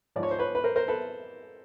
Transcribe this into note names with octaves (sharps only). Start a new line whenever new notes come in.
G#2 F3 D5
C#5
C5
B4 C#5
B4
A#4 C5
A#4 C5
A4 B4